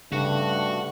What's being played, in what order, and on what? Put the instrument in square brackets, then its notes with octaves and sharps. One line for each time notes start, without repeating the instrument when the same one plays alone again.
[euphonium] G2 [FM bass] C#3 [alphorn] A3 [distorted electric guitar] F#4